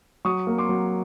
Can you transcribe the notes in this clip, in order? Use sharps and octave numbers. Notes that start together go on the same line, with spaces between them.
F#3 C#6 D#6
A#3
C6 D6
F#3